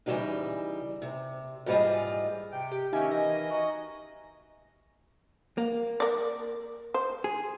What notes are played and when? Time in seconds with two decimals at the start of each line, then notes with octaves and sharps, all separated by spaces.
0.06 C#3 E3 F#3 G3 A#3 D#4
1.02 C3
1.66 G#2 E3 G3 F4 G#4 D#5
2.51 C3 G5
2.72 G4
2.93 D#3 A#3 C#4 D#4 E5 G#5
3.11 E3 A#4 D#5
3.51 D#4 F#4 D#5
5.58 A#3
6.00 A#4 D5
6.94 C5
7.24 G#4